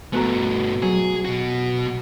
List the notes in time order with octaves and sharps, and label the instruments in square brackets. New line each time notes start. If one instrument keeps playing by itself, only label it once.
[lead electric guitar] G2 A3 [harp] B2 F#4 A#5
[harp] F#3 [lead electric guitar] G#4
[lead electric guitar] B2 F#4